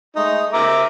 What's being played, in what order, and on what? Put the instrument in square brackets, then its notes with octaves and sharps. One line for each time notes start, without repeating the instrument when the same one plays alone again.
[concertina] G#3 A3 D#6 [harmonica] D#4
[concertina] A#4 [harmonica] E5 A#5 D6